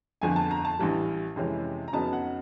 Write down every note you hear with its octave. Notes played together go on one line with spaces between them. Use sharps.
G1 F2 D3 F3 G#5
A5
A#5
A5
A1 G2 E3 G3
F2 C3 E3 G#3 C#4
A#5
F2 C#3 F#3 B3 D#4 A5
F#5